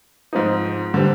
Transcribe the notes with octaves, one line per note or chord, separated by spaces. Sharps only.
G#2 F3 C4 D#4
D3 G3 C4